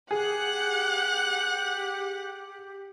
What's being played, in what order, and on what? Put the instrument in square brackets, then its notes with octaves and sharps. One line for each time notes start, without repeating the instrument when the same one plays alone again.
[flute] G4 [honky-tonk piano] G#4 [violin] F#5 F#6